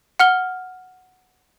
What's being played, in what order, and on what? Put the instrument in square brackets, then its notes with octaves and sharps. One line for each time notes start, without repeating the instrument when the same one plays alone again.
[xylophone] F#5 F6 G7